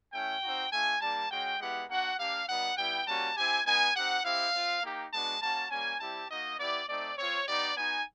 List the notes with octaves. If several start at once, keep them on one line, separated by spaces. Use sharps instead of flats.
A3 C#4 E4 G5
C4 D#4 F#4
A3 D4 F4 G#5
G3 A#3 D4 A5
G#3 C#4 F#4 G5
G#3 B3 E4 G4 F#5
A#3 D4 F#4 F#5
A#3 D4 G4 F5
G3 B3 D#4 F#5
G3 B3 E4 G5
G3 A#3 C#4 F#4 A5
C4 E4 G4 G#5
G#3 B3 D#4 G#5
C4 D#4 G4 F#5
C4 E4 G4 F5
C4 F4
A#3 D#4 G4
G#3 B3 D4 F#4 A5
A#3 C#4 F#4 A5
G3 A#3 C#4 G#5
G3 C4 E4 G4 A5
A#3 D#4 F#4 D#5
B3 E4 G4 D5
A3 C4 D#4 D5
C4 F4 C#5
B3 D#4 G4 D5
B3 D#4 F#4 G#5